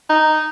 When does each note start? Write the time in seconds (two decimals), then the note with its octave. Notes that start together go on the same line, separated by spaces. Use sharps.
0.10 D#4